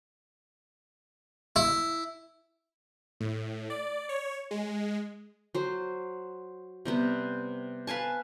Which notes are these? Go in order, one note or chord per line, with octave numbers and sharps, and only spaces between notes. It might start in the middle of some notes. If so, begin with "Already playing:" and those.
E4
A2
D5
C#5
G#3
F#3 C5
C3 G3 B3
B4 F5 G#5 A5